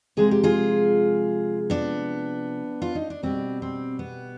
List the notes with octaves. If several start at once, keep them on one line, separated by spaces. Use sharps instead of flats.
C3 F3 G#3 G#4
G4
F4 G#4
B3 D4
F4
D#4
D4
B2 G3 C4
C4
B3